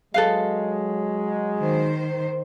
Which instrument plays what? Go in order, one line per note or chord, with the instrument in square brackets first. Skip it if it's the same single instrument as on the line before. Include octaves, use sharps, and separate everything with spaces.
[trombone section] F#3 G#3 [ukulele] A4 B4 F5
[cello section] D#3 C5